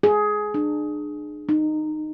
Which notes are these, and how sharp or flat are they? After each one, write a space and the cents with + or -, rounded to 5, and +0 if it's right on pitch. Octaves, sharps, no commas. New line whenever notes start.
G#4 +15
D4 +35
D#4 -15